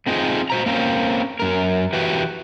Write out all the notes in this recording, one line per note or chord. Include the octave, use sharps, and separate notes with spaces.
A3 C4 D#4 F4 G#4
F#4 C5 A#5
A#3 C4 C#4
F#2 A#4
E3 F#4 G4 B4